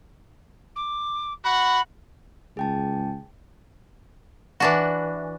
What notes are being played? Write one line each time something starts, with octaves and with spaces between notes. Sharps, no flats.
D6
F#4 F#5 B5
C#2 G#4 G5 A5
E3 D4 F#4